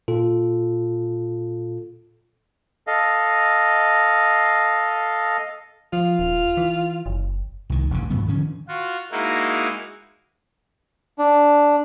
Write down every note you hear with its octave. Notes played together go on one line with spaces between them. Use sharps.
A#2 F4 A4
A4 D#5 F5
F3 F4
D#1
E3
F#1
C2 D#3
D#1 A1 F#2 C#3
G#2 C#3 F#3 B3
D3 D#3 F3 C#4
F4 F#4
G#3 A#3 D#4 E4 F#4
D4